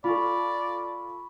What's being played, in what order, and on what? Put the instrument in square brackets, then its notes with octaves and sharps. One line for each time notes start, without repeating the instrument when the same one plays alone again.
[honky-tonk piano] F4 A4 [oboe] D5 [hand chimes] B5 C#6